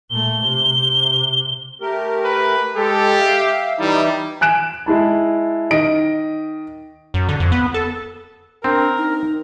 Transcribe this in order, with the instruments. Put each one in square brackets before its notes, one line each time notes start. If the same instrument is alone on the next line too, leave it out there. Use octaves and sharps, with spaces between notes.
[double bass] A#2 A3 [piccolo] G7
[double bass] C3
C3
[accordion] A3 G4 A#4
[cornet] B4
[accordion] G#3 A4 [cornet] G4
[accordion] E5 F5
[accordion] E3 D#4 E4 [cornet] G3
[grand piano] G#5 F#6 D7 E7
G#3 E4 A5
D#3 D#5 D7
[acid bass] F#2
D3
F2
B3
A4
[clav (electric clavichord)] C4 [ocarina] D4 [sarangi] A#4
[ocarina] D#4